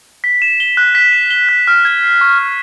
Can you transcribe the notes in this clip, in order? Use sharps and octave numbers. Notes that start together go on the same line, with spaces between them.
B6
E7
G7
F#6
B6
E7
G7
F#6
F6
G#6
C7
C#6
F6